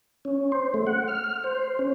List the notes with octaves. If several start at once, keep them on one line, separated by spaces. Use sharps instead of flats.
C#4
C5
A3
F#5
F6
C5
C#4